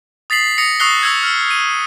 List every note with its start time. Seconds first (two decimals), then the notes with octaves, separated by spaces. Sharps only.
0.30 D#6 A6 B6 C7 F#7
0.58 D#6 A#6 C#7
0.80 C#6 D#6 E6 F#6 C7 G7
1.03 C#6 E6 G#6
1.23 E6 F6
1.51 D#7